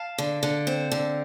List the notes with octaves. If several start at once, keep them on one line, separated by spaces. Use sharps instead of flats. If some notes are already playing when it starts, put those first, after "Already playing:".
Already playing: F5 A5
D3
D3
C4
D3